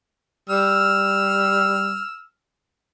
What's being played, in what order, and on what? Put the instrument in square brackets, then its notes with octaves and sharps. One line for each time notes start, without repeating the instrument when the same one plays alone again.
[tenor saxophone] G3 [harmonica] E6 F6